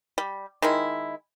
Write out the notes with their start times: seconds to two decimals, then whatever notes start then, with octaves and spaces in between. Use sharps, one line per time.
0.18 G3
0.62 D#3 G#3 E4